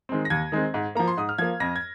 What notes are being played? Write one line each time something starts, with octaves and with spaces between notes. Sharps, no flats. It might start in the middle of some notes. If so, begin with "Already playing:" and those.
D#3 G#3 C4
A#6
D#2 G#6
D#3 G#3 C4
G#2
F3 A#3 A#5
C6
G#2 D#6
F6
F3 A#3 G#6
F2 A#6
G#6